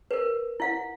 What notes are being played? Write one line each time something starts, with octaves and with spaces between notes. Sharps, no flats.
A#4 B4
E4 F5 F#5